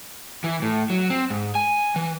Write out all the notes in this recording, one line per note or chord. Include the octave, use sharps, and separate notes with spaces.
E3
A2
F#3
C4
G#2
G#5
E3